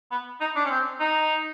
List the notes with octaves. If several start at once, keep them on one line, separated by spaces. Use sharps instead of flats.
B3
D#4
D4
C#4
C4
D#4